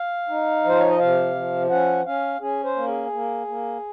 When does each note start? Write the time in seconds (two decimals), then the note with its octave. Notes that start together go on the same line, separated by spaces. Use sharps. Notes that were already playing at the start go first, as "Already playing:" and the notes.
Already playing: F5
0.29 D#4
0.64 F3 C5
0.79 C#5
0.89 D#5
0.99 C3 F5
1.35 F3
1.70 C#4 F#5
2.06 C#4 F5
2.40 C#4 G#4
2.64 C5
2.76 A#3
2.87 G#4
3.12 A#3
3.47 A#3